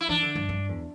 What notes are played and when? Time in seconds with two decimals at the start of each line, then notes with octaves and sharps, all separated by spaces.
0.01 E4
0.09 E3 D4
0.22 D3
0.35 G2
0.49 G2
0.69 E2